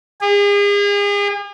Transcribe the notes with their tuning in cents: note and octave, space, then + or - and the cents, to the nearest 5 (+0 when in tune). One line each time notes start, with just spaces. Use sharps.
G#4 -40